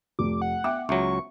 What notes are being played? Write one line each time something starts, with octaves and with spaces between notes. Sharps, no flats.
F1 D6
F#5
B3 E5 G5 D6
C#2 F#3 E5 C#6